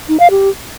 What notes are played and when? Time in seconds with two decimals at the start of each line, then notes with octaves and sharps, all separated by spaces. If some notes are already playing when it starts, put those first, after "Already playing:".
0.09 D#4
0.20 F5
0.31 G4